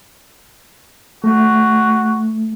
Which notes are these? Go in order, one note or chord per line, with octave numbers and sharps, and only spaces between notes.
A3 F#4